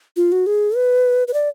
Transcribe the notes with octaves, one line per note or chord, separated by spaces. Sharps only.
F4
F#4
G#4
B4
B4
D5